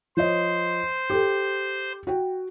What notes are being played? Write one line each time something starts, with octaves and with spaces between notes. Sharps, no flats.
F3 C5 C#5 D#5
G4 A4
F#4 G5